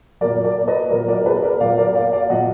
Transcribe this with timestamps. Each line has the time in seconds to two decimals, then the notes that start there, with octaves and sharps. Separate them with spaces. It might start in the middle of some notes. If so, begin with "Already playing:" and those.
0.21 F#3 A#4 D5
0.24 A#2
0.45 A#4 D5
0.68 B4 D#5
0.91 A#2 F#3 A#4 D5
1.08 A#4 D5
1.25 G#4 B4
1.43 A#4 D5
1.60 A#2 F#3 D5 F5
1.78 A#4 D5
1.95 D5 F5
2.13 D5 F5
2.30 A#2 F#3 D#5 F#5